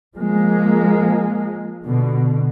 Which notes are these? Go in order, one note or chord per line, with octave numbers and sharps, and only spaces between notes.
F3 G#3 A#3
B2 D3